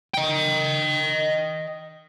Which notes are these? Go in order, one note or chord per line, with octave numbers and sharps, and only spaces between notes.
D#5 G5